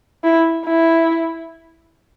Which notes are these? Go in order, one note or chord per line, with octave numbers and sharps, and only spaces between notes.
E4
E4